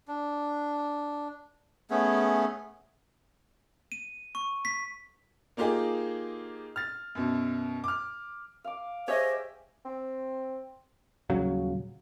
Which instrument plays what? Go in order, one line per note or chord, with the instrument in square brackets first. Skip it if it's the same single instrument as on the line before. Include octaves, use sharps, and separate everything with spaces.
[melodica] D4
A3 B3 C#4 G#4
[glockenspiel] D#7
C#6
B6
[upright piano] A#3 D#4 F4 G4 G#4
F6 A6
F#2 B2
D6 F6
[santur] F5 D6
[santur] G4 G#4 E5 [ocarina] C5 [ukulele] C#5 D#5
[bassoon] C4
[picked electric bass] D#1 C#3 F#3